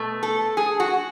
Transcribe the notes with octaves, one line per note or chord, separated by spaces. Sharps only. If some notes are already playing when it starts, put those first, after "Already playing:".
Already playing: B2 A3
A4
G#4
F#4